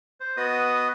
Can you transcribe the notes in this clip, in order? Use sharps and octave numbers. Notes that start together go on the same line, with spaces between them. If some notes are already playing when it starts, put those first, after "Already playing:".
C5
B3 F#4 B4 D#5 D#6